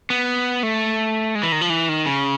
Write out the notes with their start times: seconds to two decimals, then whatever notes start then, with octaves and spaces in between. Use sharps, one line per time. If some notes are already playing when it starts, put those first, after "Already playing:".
0.10 B3
0.63 A3
1.35 G#3
1.43 E3
1.52 D#3
1.61 F3
1.70 E3
1.89 D#3
2.06 C#3